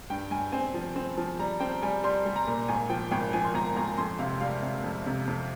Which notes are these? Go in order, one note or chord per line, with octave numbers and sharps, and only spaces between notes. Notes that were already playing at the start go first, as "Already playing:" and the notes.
G2 G5
G2 G#5
C4 G#5
F3
C4
F3
G3 A#5
C4 G5
G3 G#5
G3 C6
G3
A#5
A#2
G#1 G#5
F3 G5
G#1 G5
F3 G#5
C6
G#1 A#5
G#1 A#5
F2 C6
C3 F5
G3 F5
C3
F2
C3
F2